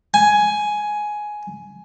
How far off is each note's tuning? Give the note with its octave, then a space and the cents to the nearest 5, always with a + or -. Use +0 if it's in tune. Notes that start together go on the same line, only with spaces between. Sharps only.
G#5 +10